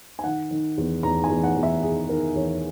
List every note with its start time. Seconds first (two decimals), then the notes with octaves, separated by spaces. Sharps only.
0.19 G#5
0.24 D#3 F#5
0.51 D#3
0.78 E2
1.03 E2 A#5
1.24 G#5
1.30 E2
1.43 F#5
1.56 E2
1.63 E5
1.82 D#3 G#4
2.09 D#3 A#4
2.35 E2 C#5